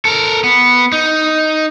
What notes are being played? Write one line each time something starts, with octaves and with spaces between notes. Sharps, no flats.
A4 A#4
B3
D#4